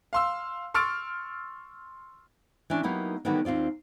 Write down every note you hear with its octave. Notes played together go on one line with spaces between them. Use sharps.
F5 C6 E6
C6 C#6 E6 F6 A6 D7
E3 C#4 D4
F#3 A#3 B3 D#4 E4 G4
D3 D#3 F#3 G3 A#3 B3
D#2 C4 F4 D5